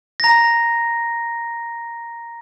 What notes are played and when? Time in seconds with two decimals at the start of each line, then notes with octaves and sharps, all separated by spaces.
0.20 A#5 A#6